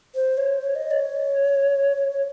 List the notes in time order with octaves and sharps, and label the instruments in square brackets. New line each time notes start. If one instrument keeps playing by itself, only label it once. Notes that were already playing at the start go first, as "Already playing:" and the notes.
[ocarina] C5
C#5
C#5
D#5
C#5
C#5
C#5